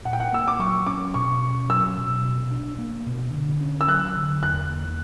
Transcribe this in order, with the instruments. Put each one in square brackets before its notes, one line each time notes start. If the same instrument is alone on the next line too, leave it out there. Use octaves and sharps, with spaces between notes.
[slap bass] A#2 [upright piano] F#5
[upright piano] G5
F#5
[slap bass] A#3 [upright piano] E6
[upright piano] D6
[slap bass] F#3 [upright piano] C#6
[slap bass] C#4 [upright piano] D6
[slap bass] B2 [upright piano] C#6
[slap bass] C#4
[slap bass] F#3 [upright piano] E6
[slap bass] B2
B2
D4
A#3
B2
D3
C#4
[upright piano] E6
[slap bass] F#3 [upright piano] F#6
[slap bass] D3
[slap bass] E2 [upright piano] F#6
[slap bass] A#3